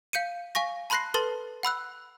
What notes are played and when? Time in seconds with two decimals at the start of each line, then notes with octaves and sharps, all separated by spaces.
0.13 F5 G6 C#7 D#7
0.55 F5 G#5 C#6 A#6
0.90 A5 B5 C6 F#6 A#6 C7
1.14 A4 B4 A5 C6 A6
1.63 F#5 B5 E6 F#6